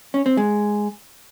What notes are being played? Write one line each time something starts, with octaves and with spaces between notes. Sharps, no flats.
C#4
C4
G#3